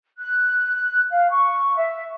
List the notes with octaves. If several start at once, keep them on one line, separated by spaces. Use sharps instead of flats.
F#6
F5
C#6
E5